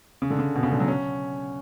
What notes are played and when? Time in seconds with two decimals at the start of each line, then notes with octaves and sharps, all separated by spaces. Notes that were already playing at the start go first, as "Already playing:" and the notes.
0.22 C#3
0.30 D3
0.39 C#3
0.55 B2
0.63 C#3
0.72 D3
0.80 F#3
0.88 C#4